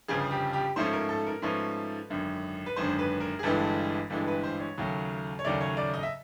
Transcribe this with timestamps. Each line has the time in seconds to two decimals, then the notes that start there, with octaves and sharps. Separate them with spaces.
0.08 G1 F2 C#3 F3 G#4
0.31 G4
0.53 G4
0.76 G#2 F3 A3 C#4 C5
0.93 A#4
1.09 A4
1.27 A#4
1.42 G#2 F3 A3 C#4 B4
2.09 G#1 F#2 D3
2.66 B4
2.76 G#1 F#2 D3 C5
2.99 B4
3.21 A#4
3.39 G#4
3.43 G1 G2 E3 G#3 A4
4.10 G1 G2 E3 G#3 A4
4.28 B4
4.43 C5
4.60 C#5
4.78 D#2 C#3 F#3 A3
5.39 C#5
5.44 D#2 C#3 F#3 A3 D5
5.61 C#5
5.77 D5
5.94 D#5
6.03 E5